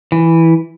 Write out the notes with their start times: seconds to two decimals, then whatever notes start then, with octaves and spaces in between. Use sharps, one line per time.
0.12 E3